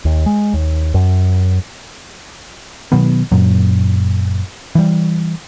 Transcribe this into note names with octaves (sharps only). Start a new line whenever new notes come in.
D#2
G#3
D#2
F#2
B2 D#3 F#3 B3
F#1 F#2 A#2 F#3
E3 G3